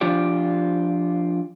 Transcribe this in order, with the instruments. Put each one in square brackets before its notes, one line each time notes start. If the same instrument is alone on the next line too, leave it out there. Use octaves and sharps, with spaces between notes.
[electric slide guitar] F3 D4 F4 G4 D5